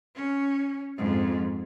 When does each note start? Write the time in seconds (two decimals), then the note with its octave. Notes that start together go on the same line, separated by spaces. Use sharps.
0.16 C#4
0.97 F2 G#2